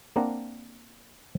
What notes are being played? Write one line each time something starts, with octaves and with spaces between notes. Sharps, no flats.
A#3 C4 D4 A#4 F5 F#5